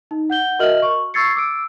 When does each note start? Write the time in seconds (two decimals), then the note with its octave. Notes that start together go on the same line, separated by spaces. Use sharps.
0.11 D#4
0.30 F#5 G6 G7
0.59 F#4 A#4 D#5 E5 F6 F#7
0.82 C#6
1.14 C#6 E6 G#6 A6 C7 C#7
1.35 D6 E6 D7